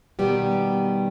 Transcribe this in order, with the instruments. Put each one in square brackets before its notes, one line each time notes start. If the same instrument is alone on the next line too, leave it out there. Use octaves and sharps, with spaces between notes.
[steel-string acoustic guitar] B2 D#3 G3 B3 G4